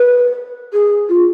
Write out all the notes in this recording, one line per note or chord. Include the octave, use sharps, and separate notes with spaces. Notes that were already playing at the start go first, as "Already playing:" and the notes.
Already playing: B4
G#4
F4